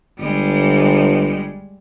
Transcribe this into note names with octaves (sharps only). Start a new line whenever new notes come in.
G1 G3 G#3